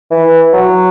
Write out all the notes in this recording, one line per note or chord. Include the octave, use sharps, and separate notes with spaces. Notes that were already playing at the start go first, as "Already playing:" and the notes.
E3
F#3